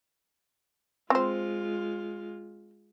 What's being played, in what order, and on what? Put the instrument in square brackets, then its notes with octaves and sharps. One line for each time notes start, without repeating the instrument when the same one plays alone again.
[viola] G#3 F4 [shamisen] C4 C5